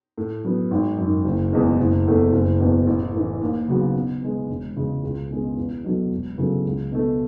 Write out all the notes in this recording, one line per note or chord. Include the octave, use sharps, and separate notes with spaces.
A2
F#3 B3
G#1
F#2
D#3
F#1
E2 B2 G#3
F#1
E2 B2 A3
F#1
E2 B2
A1
A2 E3
D#2
C#3 F#3 B3 F#4
B2
G#3 B3
E1
E2 C#3 G#3
C#2
B2 G#3 C#4 G#4
E2
B2 F#3 A3
E1
E2 C#3 F#3 A3
C#2
B2 A3